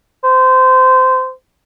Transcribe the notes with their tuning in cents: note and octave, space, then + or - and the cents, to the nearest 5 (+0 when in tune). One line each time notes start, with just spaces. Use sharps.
C5 -20